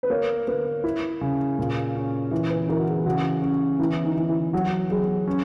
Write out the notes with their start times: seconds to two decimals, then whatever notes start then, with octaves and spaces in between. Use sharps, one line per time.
0.03 B4
0.10 A#3 C#5
0.47 A#3 B4
0.84 E4
1.21 C#3
1.59 A#2
1.96 C#4
2.31 E3
2.50 B4
2.69 E3 A#4
2.79 F#4
2.87 G#4
3.05 C#3 F#4
3.42 C#4
3.79 E3 E4
4.04 D#4
4.16 E3
4.29 E4
4.53 F#3 F#4
4.90 F#3 G#4
5.28 C#4